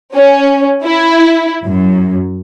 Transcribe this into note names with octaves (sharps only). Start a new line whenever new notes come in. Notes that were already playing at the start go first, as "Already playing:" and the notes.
C#4
E4
F#2